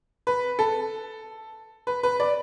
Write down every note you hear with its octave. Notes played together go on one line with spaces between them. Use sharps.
B4
A4
B4
B4
D5